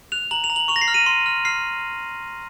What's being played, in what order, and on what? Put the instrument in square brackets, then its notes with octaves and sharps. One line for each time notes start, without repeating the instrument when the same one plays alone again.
[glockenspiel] F#6 F7
A#5 F#7
F7
A#5
F#7
C#6 F7
A#6
C7
F6
D#7
C6
F6
F6 C7